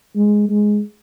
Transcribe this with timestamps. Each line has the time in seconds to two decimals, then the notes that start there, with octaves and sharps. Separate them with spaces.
0.16 G#3
0.49 G#3